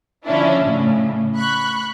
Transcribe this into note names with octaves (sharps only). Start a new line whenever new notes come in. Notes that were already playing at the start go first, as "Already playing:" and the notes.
D3 F3 C#4 D4 E4
A2 C#3
B5 C#6 F#6